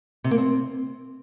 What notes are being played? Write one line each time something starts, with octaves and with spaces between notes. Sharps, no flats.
C3
A#3
C4